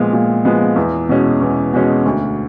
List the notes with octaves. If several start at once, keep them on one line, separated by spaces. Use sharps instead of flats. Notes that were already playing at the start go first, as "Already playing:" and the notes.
Already playing: A#2 F3 G#3 B3
A#2
F3 G#3 B3
E2
B2 G#3 C#4
E2
B2 G#3 C#4
D2